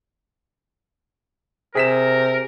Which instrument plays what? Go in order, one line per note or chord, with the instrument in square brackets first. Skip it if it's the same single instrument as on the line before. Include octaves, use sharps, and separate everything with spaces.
[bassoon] C3 [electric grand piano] G#4 B6 E7 [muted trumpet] A#4